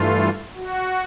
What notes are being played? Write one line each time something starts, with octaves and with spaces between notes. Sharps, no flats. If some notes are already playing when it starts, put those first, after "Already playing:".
Already playing: G2 E3 A3 F4
F#4